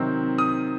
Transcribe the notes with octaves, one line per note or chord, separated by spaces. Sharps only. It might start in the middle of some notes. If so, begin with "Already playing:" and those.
Already playing: C3 D#3 F#3 C4 D#4
D#6